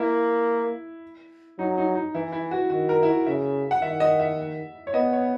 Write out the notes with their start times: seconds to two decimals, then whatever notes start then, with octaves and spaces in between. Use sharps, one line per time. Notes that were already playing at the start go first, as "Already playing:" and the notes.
Already playing: A#3 E4
1.59 F#3 D#4
1.78 D#4
1.95 D#4
2.14 E3 E4
2.32 E4
2.51 F#4
2.70 D#3 F#4
2.89 A#4
3.03 E4
3.08 F#4
3.26 C#3 E5
3.71 F#5
3.82 D#3 E5
4.00 D#5
4.20 E5
4.87 C#5
4.94 B3 D#5
5.13 C#5